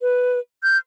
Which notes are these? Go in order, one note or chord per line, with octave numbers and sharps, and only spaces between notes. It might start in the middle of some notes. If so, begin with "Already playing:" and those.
B4
F6 G6